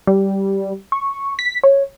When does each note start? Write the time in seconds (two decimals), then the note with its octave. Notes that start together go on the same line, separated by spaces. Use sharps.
0.07 G3
0.92 C#6
1.39 B6
1.63 C#5